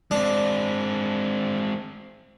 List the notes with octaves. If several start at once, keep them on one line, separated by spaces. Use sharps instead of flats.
G#3 C4 D4